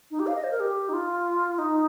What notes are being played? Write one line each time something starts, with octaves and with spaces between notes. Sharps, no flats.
D#4
G4
F5
D#5
C5
A#4
G4
D#4
F4
D#4